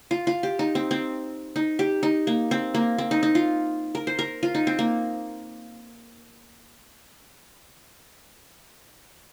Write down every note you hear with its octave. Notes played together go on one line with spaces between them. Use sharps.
F4
F4
G4
D#4
C4
C4
D#4
G4
D#4
A#3
C4
A#3
C4
D#4
D#4
F4
A#4
C5
A#4
F4
D#4
C4
A#3